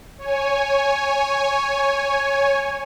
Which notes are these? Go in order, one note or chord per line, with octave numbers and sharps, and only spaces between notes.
C#5 G#5